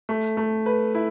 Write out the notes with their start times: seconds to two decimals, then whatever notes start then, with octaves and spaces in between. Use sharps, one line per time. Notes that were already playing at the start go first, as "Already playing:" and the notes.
0.09 A3
0.37 A3
0.66 B4
0.95 E4